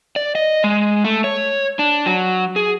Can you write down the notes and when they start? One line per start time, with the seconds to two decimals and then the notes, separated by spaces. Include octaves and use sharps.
0.16 D5
0.35 D#5
0.64 G#3
1.04 A3
1.24 C#5
1.79 D4
2.06 F#3
2.56 G#4